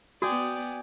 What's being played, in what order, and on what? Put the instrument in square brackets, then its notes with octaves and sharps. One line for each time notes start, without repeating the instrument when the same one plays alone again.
[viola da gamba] B3 D5 [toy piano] F#4 [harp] G5 G#5 D#6